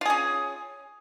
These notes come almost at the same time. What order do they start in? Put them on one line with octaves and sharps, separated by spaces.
F4 G#4 C#4